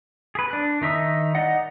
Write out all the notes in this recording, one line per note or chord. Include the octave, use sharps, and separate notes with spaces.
G#4 B4
D4 F#6
D#3 D#4 E5 D#6
D#4 D5 D#5 F#5